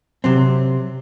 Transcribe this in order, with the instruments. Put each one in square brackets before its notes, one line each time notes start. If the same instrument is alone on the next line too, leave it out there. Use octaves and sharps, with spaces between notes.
[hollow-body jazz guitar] C3 F#3 C4